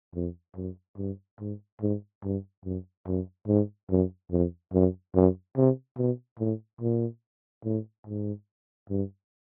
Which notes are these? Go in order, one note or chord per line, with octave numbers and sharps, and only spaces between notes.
F2
F#2
G2
G#2
G#2
G2
F#2
F#2
G#2
F#2
F2
F#2
F#2
C3
B2
A2
A#2
A2
G#2
G2